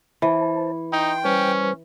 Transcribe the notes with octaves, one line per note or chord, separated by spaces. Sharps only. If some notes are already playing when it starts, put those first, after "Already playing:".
E3 C5 A5
D#4 G5 C6
G3 C#4 B4 C5